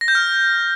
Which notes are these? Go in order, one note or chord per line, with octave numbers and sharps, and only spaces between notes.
A#6
G6
F6